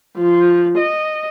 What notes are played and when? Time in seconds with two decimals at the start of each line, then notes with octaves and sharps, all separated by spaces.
0.16 F3
0.77 D#5